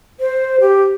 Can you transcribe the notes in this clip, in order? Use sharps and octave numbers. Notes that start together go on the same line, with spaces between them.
C5
G4